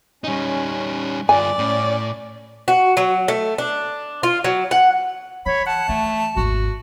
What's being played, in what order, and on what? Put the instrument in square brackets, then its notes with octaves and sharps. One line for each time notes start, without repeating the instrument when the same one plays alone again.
[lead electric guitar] G3 D#4 [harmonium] C#4
[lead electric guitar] G2 F4 [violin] D5 [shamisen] G#5
[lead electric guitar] A2 [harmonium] C#4
[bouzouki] F#4
F#3
A3
D4
F4
F#3
F#5
[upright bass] E3 [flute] C#5 [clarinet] B5
[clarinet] F#5 [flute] A5
[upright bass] D#3 E3 [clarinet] A3
[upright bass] G#1 D#2 [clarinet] F#4